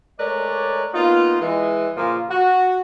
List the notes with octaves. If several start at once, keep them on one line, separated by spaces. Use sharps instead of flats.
G#3 A3 A#4 B4 C#5 D5
A#3 B3 D#4 F4
E3 G#3
A#2 C#3 F3 A#3 F4
F#4